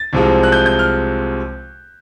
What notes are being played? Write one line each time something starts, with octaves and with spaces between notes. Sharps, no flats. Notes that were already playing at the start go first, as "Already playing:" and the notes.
Already playing: A6
C2 C3 F3 G#3
F#6
G6
G6
F6